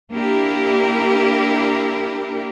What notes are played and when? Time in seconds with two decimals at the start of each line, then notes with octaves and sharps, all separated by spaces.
0.11 A#3 D4 E4 G4 A#4